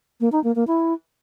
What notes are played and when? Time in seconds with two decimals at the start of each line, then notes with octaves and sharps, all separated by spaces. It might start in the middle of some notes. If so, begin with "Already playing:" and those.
0.21 A#3
0.32 D#4
0.44 A#3
0.56 A#3
0.67 E4